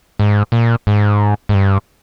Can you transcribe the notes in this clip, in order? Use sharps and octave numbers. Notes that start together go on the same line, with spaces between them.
G#2
A#2
G#2
G#2
G2